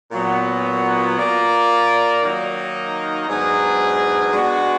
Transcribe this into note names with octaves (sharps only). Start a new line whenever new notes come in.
A#2 F#3 B3
A#3 F4 A#4 D5
D#3 F#3 A#3 D#4
G#2 F#3 B3 D4 G#4
G#3 B3 D4 F#4